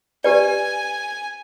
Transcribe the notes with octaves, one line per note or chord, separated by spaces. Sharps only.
G4 B4 D5 G#5